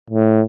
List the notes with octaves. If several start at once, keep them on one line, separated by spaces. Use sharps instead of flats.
A2